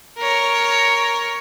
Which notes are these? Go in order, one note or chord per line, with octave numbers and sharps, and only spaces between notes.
A#4 C#5